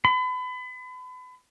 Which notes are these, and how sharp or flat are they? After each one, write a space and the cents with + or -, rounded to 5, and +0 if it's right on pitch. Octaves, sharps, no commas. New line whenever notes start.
B5 +35